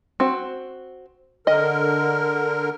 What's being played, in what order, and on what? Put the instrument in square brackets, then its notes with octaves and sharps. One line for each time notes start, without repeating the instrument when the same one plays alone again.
[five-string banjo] C4 F#4
[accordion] D3 A#4 [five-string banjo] D#5